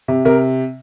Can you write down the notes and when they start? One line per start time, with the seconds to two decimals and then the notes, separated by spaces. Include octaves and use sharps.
0.08 C3
0.25 C3 A#4